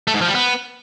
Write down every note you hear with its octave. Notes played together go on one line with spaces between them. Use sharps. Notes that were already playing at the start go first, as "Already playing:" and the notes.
A3
G#2
F3
G3
B3